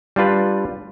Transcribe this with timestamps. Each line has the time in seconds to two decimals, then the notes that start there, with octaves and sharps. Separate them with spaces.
0.16 G3 D4 F4 B4